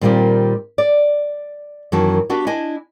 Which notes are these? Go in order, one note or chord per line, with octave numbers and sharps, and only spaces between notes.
A#2 D#3 G3 C4 F4 G4
D5
F#2 D#3 E3 A#3 F#4 A5
B3 D4 F#4 G4 B4
D4 E4 D#5 G#5